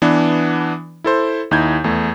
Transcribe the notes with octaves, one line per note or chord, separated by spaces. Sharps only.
E3 B3 D4
E4 A4 C5
D#2 D#4 E4 G6 G#6
E2 A3